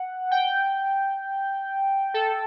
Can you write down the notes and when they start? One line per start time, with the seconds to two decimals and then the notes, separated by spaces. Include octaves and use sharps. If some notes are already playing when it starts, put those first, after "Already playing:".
Already playing: F#5
0.31 G5
2.14 A4